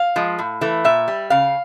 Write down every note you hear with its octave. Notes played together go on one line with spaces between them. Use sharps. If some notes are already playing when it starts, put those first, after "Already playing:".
Already playing: F5
F3 G#3
A2
E3 A3
A#2 E5
G3
C#3 F5